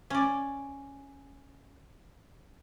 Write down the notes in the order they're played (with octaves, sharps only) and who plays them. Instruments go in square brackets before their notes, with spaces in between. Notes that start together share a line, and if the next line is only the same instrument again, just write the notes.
[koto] C#4 D5